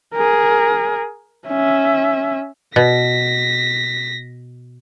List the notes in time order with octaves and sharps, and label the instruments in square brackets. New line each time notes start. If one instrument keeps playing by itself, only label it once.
[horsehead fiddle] G#4 A#4
C#4 E5
[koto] B2 [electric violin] A#6 B6